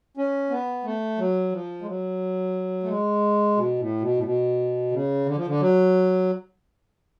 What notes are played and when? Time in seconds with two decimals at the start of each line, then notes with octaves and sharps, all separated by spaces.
0.17 C#4
0.50 B3
0.84 A3
1.18 F#3
1.52 F3
1.82 G#3
1.86 F#3
2.83 A3
2.88 G#3
3.57 B2
3.79 A2
4.01 B2
4.16 A2
4.24 B2
4.92 C#3
5.26 D3
5.36 F3
5.47 D3
5.60 F#3